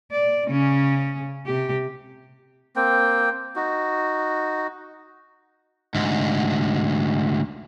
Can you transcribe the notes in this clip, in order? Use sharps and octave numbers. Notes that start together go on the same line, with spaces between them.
D5
C#3 C#4
C3 G4
A#3 C4 G5
D#4 F#4
D2 G#2